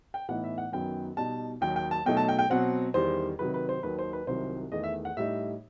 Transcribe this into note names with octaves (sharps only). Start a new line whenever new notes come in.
G5
A2 E3 B3 D#4 F#5
E5
F#5
F#2 D#3 F#3 B3 G5
B2 G3 D#4 A5
D#2 D#3 F#3 G5
G5
A5
B2 F#3 A3 D#4 G5
A5
G5
G5
B2 F#3 C4 F#5
E2 D#3 G3 C5
C3 D#3 F#3 B4
B4
C5
D#2 D#3 F#3 B4
C5
B4
C2 C3 D#3 F#3 C5
E2 D#3 A3 D#5
E5
F#5
A2 G3 D#4 E5